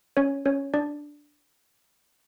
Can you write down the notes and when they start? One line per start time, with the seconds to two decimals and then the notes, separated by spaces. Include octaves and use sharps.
0.17 C#4 C#5
0.45 C#4 C#5
0.74 D4 D5